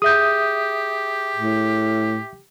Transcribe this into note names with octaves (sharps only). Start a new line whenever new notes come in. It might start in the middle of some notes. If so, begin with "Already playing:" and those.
G4 G#4 E5 D#6 G6
A2